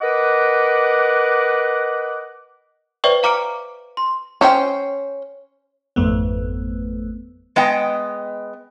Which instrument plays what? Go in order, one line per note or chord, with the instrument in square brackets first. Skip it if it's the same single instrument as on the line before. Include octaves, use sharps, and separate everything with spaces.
[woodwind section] A#4 B4 D#5 F#5 D6
[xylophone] B4 C5 D5 E5 G5 C#6
F5 A#5 D6 F6 C#7 D7
C6
[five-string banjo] C#4 C5 E5 G5
[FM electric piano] G#1 F2 A3 B3
[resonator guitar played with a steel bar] G#3 B3 D#5 G5